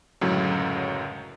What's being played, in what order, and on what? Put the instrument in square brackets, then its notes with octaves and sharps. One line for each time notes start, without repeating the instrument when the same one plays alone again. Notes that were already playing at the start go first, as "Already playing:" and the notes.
[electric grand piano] C#2 F#2 A2 D3 F#3